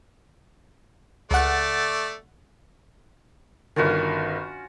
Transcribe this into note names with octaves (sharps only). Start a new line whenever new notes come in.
C#2 A3 D5 F#5
G1 D#3 C#4 F4 F#4